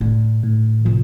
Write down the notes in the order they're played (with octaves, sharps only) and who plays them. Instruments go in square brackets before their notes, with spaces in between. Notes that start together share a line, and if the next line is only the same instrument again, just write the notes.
[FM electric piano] A2 [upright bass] D3
[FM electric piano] A2
[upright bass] C3 [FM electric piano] F3